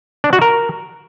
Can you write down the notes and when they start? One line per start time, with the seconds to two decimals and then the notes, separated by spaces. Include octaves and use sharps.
0.24 D4
0.33 F#4
0.41 A#4